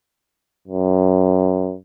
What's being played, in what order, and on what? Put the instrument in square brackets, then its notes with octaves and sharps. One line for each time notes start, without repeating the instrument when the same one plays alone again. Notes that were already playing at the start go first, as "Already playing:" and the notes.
[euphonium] F#2